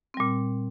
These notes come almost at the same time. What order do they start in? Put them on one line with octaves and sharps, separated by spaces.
C4 G3 A#2